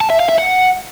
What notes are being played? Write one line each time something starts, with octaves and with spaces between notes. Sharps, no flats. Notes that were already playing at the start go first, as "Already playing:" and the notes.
A5
E5
F5
E5
F#5